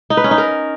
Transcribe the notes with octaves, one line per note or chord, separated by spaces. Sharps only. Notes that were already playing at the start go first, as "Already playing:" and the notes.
D#4
B4
C#4
D#4
A#4